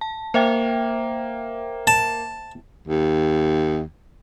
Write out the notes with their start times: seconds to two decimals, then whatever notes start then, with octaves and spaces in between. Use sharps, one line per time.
0.01 A5
0.34 A#3 C5 E5 G5
1.87 A5
2.88 D#2